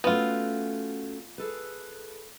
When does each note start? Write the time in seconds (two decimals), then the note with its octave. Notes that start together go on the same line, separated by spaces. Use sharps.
0.04 A3 B3 C#4 F4 F#4
1.38 G#4 A4 B4